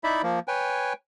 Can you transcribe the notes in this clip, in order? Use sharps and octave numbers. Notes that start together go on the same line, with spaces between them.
D#4 E4 D5 E5 B5
F3 A#3
B4 C#5 G5 G#5